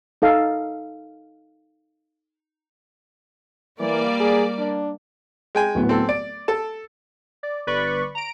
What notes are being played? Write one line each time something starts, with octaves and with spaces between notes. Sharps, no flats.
D#4 A4 F5
E3 G3 A#3 D5
G#4
D4
G#3 G5 G#5
D1 A2 B3
C4 A4
D5 D7
A4 A5
D5
G1 B4 D5 B5 C#6
A#5 D7